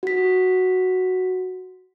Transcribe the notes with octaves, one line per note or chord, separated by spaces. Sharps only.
F#4 B6